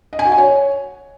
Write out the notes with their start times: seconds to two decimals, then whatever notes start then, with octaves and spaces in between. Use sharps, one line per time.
0.13 D#5
0.19 G#5
0.25 F#4
0.32 G#5
0.38 C#5